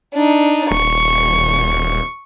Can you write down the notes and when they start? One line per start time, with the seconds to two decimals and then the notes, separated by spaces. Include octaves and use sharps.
0.14 D4 D#4
0.71 D#1 C#6